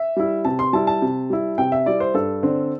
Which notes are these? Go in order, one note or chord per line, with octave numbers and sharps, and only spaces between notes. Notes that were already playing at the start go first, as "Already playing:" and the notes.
Already playing: E5
G3 E4
C3 A5
C6
G3 E4 A5
A5
C3
G3 E4
C3 G5
E5
G3 E4 D5
C5
G2 A4
D3 C4